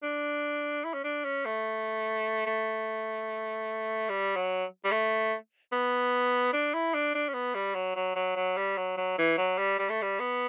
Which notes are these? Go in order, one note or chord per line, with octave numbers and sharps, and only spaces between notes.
D4
E4
C#4
D4
C#4
A3
A3
G3
F#3
G3
A3
B3
D4
E4
D4
D4
C#4
B3
G3
F#3
F#3
F#3
F#3
G3
F#3
F#3
E3
F#3
G3
G3
A3
G3
B3